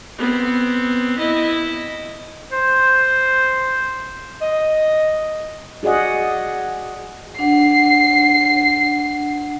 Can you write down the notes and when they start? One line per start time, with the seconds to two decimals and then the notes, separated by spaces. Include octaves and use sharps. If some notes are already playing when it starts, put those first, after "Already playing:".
0.19 B3 C4
1.18 E4 D#5
2.52 C5
4.41 D#5
5.83 F#4 G#4 D5 D#5 F#5
7.39 D4 F#5 C7